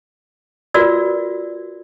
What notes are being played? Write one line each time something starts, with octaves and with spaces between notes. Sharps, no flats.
F4 F#4 A#4 B4 D5 E6